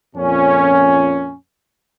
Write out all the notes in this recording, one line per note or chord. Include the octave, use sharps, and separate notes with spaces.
F2 A#2 C#4